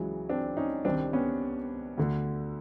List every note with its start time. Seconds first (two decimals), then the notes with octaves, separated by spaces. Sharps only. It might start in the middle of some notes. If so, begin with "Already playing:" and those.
Already playing: C#2 C#3 E3 F#3 G#3
0.29 C4 D4
0.57 C#4 D#4
0.85 C2 C3 D#3 C4 D4
1.13 B3 C#4
1.97 D2 D3